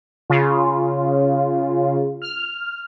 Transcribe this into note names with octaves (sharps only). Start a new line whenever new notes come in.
C#3 F4
F6